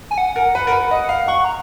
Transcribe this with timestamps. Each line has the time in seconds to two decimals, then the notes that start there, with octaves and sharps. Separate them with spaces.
0.11 G#5
0.18 F#5
0.36 A#4
0.55 B4
0.67 A#4
0.72 B4
0.91 D#5
1.09 F5
1.28 F#5 C#6
1.45 A#5